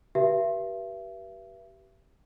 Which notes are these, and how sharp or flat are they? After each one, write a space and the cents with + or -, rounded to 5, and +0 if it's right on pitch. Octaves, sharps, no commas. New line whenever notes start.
G4 -25 B4 -35 E5 +35